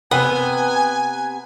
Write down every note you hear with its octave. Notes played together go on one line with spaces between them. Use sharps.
C3 B3 B4 G#5